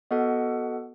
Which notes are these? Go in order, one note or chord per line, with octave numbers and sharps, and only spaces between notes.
B3 F#4 A4 D#5 F#5